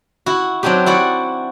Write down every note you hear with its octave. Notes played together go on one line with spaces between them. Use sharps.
E4 F#4
F#3 C4 D4 D#4 G4
E4 F#4 D5 F#5